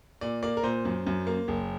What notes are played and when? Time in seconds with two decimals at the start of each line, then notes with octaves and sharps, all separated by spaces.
0.21 A#2 D5
0.43 A#3 D5
0.57 A#4
0.63 A#2 C5
0.85 F#2
1.07 F#2
1.27 A#3
1.48 F#1